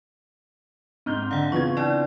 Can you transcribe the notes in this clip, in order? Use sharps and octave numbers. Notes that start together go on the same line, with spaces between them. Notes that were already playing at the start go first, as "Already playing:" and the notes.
G#2 C4 F6 G6
D3 F5 F#5
C#3 E3 B3 C4 F4 C#6 G#6
D4 E4 D5